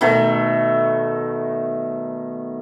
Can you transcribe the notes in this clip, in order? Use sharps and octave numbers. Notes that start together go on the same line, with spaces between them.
B2 D#3 A3